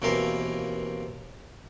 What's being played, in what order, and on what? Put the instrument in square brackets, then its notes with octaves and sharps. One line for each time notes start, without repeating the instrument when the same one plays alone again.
[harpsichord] D#2 B2 E3 C4 A#4 F5